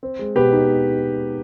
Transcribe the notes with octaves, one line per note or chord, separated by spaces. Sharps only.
C4
G#3
B2 G4 B4
D#4